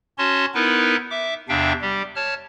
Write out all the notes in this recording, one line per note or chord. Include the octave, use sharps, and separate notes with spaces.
C#4 F#4 C#5 A5 C6
B3 D#4 E4 A#4 B4
E5 D6
E2 C3 D4 E5 F5 G5
G3 G4
C#5 A5 F6